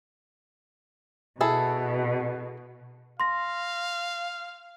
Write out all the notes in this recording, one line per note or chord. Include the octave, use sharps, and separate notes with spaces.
B2 E4 G#4 A4
F5 C6 A#6